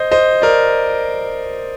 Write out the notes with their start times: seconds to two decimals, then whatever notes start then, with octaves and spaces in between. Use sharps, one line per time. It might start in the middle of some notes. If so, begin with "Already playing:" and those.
Already playing: C5 D#5
0.11 C5 D#5
0.42 A#4 D5